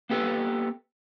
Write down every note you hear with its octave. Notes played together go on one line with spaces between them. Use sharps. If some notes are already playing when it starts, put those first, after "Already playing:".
A#3 B3 G4 A4 B4